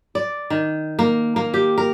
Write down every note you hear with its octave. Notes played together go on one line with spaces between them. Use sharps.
D5
D#3
A#3
A#3
G4
A#4